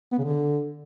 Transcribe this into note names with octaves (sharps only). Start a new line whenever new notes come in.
B3
C#3
D3